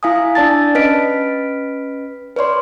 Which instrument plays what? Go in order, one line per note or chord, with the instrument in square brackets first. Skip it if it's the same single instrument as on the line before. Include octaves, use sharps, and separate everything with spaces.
[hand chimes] E4 F5 G#5 D#6
D4 D5 A5 A6
C#4 B4 D#5 B6 D7
B4 C#5 D5 C6